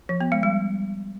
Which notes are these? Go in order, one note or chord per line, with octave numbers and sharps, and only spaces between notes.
F3
B3
G#3
G3